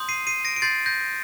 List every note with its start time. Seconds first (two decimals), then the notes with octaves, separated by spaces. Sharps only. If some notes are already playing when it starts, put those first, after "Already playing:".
Already playing: C6 D#6 G6
0.09 C7 D#7
0.27 C7 D#7
0.45 A#6 D7
0.56 D7
0.62 C6 G6 A6 C7
0.86 G6 A#6